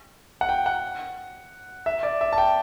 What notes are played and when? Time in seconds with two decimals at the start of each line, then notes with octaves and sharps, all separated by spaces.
0.41 F#5
0.49 G5
0.66 F#5
1.86 E5
2.03 D5
2.21 E5
2.33 A5
2.38 G5